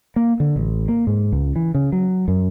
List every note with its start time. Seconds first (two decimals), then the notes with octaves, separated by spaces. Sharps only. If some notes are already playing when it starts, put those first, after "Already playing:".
0.16 A#3
0.40 D3
0.56 A1
0.88 A#3
1.07 G#2
1.32 C#2
1.56 E3
1.75 C#3
1.92 F#3
2.28 F#2